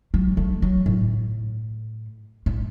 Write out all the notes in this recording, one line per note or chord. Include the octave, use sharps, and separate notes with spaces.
F#3
A3
F#3
A2
A2